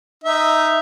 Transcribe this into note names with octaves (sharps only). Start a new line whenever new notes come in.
D#4 E5